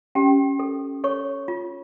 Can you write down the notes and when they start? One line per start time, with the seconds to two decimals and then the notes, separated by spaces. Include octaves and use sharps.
0.15 C#4 G4 G5
0.59 A4
1.04 A4 C#5 C#6
1.48 F4